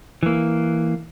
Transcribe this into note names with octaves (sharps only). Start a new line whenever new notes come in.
E3 A#3